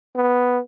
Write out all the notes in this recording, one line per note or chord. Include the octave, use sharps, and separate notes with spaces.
B3